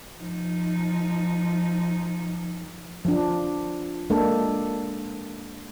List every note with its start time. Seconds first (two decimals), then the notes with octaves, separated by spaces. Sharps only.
0.19 F3 D#4
3.05 F3 D4
4.10 G#3 A#3 D4 A4